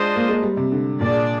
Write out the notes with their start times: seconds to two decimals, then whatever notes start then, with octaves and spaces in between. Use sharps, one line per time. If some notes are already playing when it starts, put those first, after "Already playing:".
Already playing: G#3 D4 F4 C5 D#5
0.16 A#3
0.29 G#3
0.43 G3
0.57 C3
0.72 D3
1.01 A#2 D4 G#4 D5